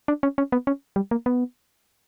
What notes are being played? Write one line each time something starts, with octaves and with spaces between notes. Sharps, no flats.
D4
C#4
C#4
B3
C#4
G3
A#3
B3